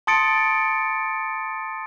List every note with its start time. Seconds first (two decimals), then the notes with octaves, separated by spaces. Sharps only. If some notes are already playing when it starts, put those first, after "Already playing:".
0.07 A5 C6 D#6 A6 C#7 D7